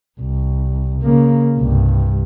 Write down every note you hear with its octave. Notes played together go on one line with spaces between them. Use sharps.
C2
C#3 A#3
C2 G2